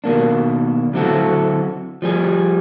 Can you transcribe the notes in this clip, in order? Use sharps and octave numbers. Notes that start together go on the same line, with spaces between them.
B2 D#3 A#3 D4
D3 F#3 C4 E4 F#4 A4
F3 G3 G#4